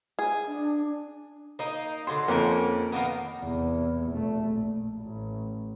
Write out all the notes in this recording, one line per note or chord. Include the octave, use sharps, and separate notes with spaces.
G#4
D4
A#3 D#4
D3 F#3 C6
F2 A#3 C#4 A#4
D#3 A#3 B3
E2 C3
F1 A3
A#1
A1